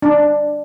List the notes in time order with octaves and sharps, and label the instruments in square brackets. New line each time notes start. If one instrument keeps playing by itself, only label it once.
[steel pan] D4